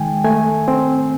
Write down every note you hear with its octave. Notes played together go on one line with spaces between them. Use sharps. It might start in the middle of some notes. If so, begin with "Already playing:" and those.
Already playing: D#3 G#3 G5 G#5
A3 G#5
C4